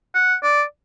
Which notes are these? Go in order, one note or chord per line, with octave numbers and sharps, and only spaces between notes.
F#5
D5